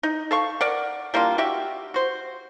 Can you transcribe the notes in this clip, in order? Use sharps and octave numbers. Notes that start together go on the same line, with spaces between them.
D#4
A4 F5 C#6
A#4 D5 F#5
G3 A#3 D4 F4
F#4 G4 E5
F#4 C5